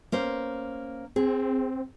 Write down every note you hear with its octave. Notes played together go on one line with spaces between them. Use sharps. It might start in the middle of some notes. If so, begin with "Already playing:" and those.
A#3 C#4 C5
C4 G#4